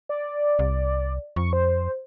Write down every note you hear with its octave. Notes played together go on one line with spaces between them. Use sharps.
D5
C2
F2 C#6
C5